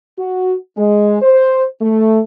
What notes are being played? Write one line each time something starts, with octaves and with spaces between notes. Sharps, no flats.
F#4
G#3
C5
A3